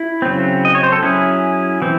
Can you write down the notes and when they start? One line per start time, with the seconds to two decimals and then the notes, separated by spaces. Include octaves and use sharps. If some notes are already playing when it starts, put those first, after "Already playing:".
Already playing: E4
0.22 C#3 F#3 C4
0.65 D#5
0.75 C#5
0.83 C5
0.92 A4
1.02 F#3 C#4 E4 G#4
1.82 E3 C4